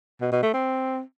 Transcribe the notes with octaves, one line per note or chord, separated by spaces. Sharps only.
B2
B2
A3
C4